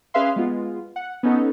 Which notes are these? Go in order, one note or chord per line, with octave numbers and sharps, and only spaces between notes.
C#4 G#4 B4 E5 F5 C6
G#3 B3 F4
F#5
B3 C#4 D#4 A4